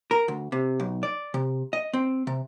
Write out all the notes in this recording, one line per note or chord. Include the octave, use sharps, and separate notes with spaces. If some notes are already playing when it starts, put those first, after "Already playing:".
A#4
D2
C3
B1
D5
C3
D#5
C4
C3